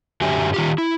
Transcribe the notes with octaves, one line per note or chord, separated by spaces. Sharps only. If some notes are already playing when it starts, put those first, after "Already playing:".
F#2 D3 F#3 G4 E5 G#5
D#3 F4 G4
E4